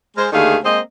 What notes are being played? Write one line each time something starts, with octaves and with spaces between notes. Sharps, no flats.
G#3 A#4 C5
D#2 D3 D#3 A3 G#4 F5
G#3 A#3 C4 C5 D#5